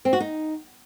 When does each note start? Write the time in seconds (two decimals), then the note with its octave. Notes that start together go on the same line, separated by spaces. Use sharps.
0.05 C4
0.13 F#4
0.20 D#4